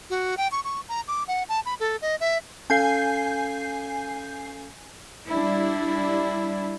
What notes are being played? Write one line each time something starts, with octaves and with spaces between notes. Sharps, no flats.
F#4
G5
C#6
C#6
A#5
D6
F#5
A5
B5
A4
D#5
E5
C#4 A4 F5 G#5 G6 C7
G3 D4 E4